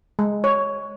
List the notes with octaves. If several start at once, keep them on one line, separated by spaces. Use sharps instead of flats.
G#3
C#5